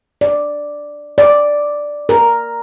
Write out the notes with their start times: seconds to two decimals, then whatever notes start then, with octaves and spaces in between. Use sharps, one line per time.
0.21 D5
1.18 D5
2.09 A#4